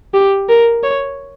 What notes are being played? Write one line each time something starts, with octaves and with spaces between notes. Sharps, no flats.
G4
A#4
C#5